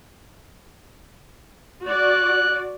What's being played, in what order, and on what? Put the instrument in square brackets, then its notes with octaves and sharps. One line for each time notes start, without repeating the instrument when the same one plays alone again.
[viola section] F#4 D5 [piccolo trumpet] F#6